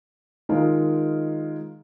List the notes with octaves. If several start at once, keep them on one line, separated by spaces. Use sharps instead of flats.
D#3 G#3 D#4 F4 A#4